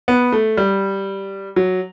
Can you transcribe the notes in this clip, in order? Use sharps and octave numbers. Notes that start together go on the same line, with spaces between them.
B3
A3
G3
F#3